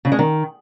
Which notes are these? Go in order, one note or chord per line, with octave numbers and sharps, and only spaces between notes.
C#3
G#3
D#3